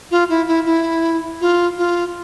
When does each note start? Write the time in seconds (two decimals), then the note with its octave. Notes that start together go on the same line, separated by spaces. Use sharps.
0.11 F4
0.29 E4
0.47 E4
0.65 E4
1.40 F4
1.77 F4